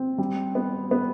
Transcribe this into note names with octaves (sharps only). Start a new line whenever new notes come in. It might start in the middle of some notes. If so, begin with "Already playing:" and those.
Already playing: C4
G3
B3
B3